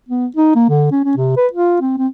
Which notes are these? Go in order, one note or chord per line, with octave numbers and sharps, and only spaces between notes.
B3
D#4
A#3
D3
C#4
C#4
C3
B4
F4
C4
C4